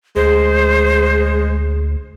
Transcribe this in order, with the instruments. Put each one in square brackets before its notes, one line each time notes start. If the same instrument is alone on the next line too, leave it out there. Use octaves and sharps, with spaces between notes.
[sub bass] D2 [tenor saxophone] G#3 [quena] C5